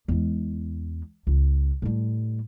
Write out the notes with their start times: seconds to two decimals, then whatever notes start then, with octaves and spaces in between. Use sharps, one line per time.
0.08 E2 G#3
1.27 C#2
1.82 A2 G3